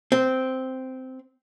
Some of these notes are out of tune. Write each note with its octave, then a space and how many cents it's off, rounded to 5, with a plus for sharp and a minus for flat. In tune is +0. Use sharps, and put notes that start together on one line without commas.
C4 -10